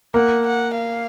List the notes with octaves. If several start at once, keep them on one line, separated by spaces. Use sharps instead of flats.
A#3 F#5
F#5
F5